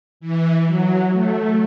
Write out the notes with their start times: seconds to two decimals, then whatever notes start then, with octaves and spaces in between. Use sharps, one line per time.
0.20 E3
0.67 F#3
1.12 A3